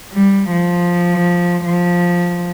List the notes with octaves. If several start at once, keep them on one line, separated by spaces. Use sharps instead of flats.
G3
F3
F3